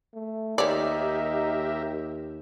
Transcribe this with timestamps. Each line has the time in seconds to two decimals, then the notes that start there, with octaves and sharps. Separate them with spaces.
0.14 A3
0.58 D#2 D#4 G4 A#4 C#5 D5 E5